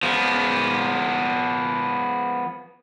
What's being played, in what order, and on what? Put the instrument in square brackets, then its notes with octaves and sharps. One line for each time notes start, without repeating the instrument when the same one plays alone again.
[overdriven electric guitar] F3 B3